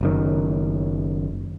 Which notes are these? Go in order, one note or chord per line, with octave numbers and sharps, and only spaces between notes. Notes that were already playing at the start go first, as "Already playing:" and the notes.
F#1 F#2 D#3